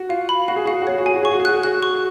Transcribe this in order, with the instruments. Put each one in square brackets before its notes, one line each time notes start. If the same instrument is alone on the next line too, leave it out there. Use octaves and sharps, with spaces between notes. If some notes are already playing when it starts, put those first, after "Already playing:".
Already playing: [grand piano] F#4
[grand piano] F4 [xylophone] F5
[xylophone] B5
[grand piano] F#4 [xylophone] F5
[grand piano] G#4
[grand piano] F#4 [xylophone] F5
[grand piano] G#4
F#4
[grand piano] G#4 [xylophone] C#5
[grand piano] F#4
[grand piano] G#4 [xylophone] G#5
[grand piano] F#4
[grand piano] G#4 [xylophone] C#6
[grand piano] F#4
G#4
[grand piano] F#4 [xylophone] F#6
[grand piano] G#4
[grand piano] F#4 [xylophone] F#6
[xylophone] C#6